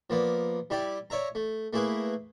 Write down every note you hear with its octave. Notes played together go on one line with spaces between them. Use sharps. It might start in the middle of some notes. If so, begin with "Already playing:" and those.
F3 A#3 B3 D5
G3 E4 G4 D5
C#5 D5 E5 A#5
A3
A3 A#3 E4 G#4 B4